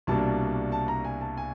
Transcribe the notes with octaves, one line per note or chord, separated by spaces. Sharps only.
C2 B2 G3 A#3 D4 A5
A5
A#5
G#5
A5
G#5